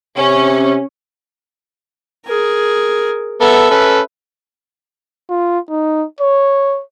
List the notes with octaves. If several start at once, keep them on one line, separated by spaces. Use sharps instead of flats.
C3 C#4
G#4 A#4
B3 A4 E5
C#4 A4 B4
F4
D#4
C#5